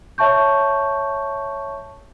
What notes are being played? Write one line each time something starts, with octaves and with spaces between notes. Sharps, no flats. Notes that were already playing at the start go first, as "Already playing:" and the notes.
C#5 E5 A5 C#6 G6